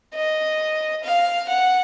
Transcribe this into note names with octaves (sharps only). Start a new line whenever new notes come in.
D#5
F5
F#5